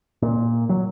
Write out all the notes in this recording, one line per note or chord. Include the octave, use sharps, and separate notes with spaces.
A#2
F#3